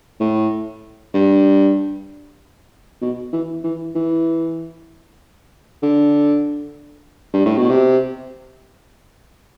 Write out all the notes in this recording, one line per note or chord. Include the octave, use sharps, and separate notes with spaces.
A2
G2
B2
E3
E3
E3
D3
G2
A2
B2
C3